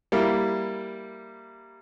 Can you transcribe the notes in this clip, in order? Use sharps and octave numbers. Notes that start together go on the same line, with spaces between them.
G3 A#3 E4